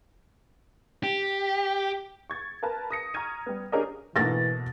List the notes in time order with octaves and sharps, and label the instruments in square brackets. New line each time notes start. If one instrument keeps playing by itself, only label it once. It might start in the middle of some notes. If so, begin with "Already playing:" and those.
[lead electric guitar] G4
[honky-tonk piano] C#6 G#6 A6
A#4 B4 A5
D#6 A#6 C#7
A#5 C#6 F6 G#6 D#7
G3 B3
D4 G4 G#4 A#4 C#5 D#5
[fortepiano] G#2 A3 A#3 [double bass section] B2 [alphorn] E3 [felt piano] A6 A#6